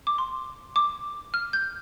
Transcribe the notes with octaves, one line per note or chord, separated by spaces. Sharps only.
D6
C6
D6
F6
G6